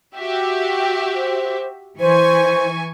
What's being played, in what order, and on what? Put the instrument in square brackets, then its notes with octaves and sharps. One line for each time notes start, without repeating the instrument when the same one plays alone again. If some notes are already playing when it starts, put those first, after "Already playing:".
[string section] F#4 G4 E5
[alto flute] C5
[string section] E3 G#5 C#6 [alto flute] C5